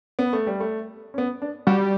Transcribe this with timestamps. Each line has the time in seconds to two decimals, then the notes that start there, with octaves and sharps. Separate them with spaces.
0.19 B3
0.33 A3
0.47 G3
0.60 A3
1.14 C#4
1.18 B3
1.42 D4
1.67 G3 F#4